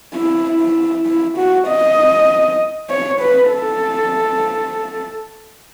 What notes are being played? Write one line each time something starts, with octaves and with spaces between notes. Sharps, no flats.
E4
E4
E4
F#4
D#5
C#5
B4
A4